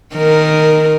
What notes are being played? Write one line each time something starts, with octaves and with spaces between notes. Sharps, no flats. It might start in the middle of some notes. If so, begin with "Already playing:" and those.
D#3 A#4